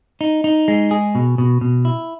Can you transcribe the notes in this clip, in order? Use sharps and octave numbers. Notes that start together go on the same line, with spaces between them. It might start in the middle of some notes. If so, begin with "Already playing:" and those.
D#4
D#4
G#3
G#4
B2
B2
B2
E4